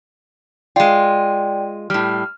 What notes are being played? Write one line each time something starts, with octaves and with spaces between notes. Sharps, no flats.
G#3 F4 D5 G5
A2 G3 F6